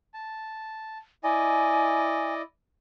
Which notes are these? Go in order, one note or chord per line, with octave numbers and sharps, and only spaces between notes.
A5
E4 D5 D#5 G#5